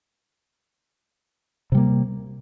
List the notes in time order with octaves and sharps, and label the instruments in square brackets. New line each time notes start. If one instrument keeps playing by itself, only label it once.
[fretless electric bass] C3
G3
A#3